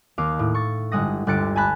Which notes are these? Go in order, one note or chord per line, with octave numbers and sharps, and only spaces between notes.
D#2 D#4 F5 D6
A2
C#6 A6
G1 G#3 F#5 D#6 A#6
G1 D2 F#6 A6 C#7 D7
G#5 A5 B5 F#6